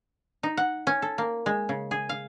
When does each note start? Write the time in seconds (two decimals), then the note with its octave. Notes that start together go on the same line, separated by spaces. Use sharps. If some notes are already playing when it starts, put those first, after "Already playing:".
0.43 D#4
0.57 F#5
0.87 C#4
1.02 A4
1.18 A#3
1.46 G#3
1.69 C#3
1.91 G#4
2.09 F5